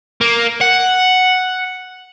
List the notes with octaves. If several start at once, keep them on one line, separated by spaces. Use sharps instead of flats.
A#3
F#5